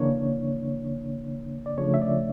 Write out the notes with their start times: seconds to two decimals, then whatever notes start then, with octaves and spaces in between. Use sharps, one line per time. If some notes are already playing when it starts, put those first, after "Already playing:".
Already playing: C#3 E3 A#3 D4 C#5
1.66 D5
1.78 C#3 F3 A3 D4 C#5
1.94 E5
2.02 D5